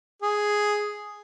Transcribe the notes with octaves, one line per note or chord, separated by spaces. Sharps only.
G#4